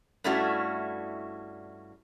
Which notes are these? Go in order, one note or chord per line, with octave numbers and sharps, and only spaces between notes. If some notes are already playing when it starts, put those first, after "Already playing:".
G2 G3 A3 C#4 E4 F#4